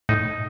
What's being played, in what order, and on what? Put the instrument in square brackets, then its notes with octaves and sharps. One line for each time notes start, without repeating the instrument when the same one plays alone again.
[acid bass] A2 [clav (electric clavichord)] D#4